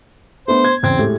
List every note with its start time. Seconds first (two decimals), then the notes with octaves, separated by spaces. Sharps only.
0.48 A3 B3 D4 C5
0.65 G#6
0.83 E2 C#3 C4 G#6
0.99 A2 G#3 G4